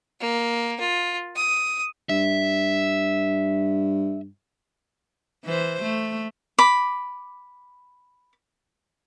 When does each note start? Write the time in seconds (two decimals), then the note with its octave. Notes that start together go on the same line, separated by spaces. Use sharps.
0.20 A#3
0.80 F4
1.36 D#6
2.09 G2 E5
5.45 E3 C5
5.83 A3
6.58 B5 D6